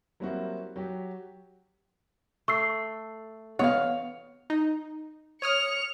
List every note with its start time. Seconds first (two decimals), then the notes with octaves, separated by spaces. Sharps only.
0.20 F#3 G3 A#3 C4 E4 F#4
0.76 F#3 F#4 G4
2.48 A3 C#6 E6 C7
3.59 B3 C#5 D#5 F5 F#5
4.50 D#4
5.42 C#5 D#6 F6 C#7 F7